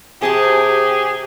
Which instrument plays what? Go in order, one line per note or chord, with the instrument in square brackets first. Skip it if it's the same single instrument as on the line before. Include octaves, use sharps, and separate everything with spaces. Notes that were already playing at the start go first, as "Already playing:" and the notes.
[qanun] C3 A5 C6 [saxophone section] G4 G#4